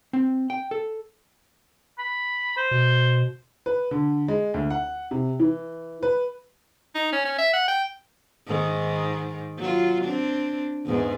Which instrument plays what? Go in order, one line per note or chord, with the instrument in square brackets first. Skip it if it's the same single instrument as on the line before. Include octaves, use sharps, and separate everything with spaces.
[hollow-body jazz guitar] C4
G5
A4
[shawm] B5
C5
[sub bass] B2
[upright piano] B4
D3
G#3
D2
F#5
C3
E3
B4
[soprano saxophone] D#4
C#4
C#4
E5
F#5
G5
[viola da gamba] G#2 D#3
F#3 F4
C4 D4
E2 G#2